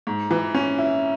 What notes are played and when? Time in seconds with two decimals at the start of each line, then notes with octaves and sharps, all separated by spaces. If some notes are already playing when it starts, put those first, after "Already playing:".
0.07 G#2
0.31 E3
0.54 C#4
0.78 E4